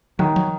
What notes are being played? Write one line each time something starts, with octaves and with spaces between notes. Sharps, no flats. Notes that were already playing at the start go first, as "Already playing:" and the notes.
D#3 F#3
F#3